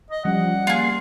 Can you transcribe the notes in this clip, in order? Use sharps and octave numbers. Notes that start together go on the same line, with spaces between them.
D#5
F3 G3 C#4 F#5
A#3 F4 G#4